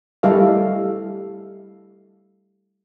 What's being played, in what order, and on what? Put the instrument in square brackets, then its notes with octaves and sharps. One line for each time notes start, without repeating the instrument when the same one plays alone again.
[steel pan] G3 A3 E4 A4 D#5 F5